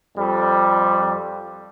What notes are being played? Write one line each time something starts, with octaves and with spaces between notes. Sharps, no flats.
F2 G3